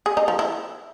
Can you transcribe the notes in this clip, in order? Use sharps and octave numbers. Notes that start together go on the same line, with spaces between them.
G#4
D#4
F3
E4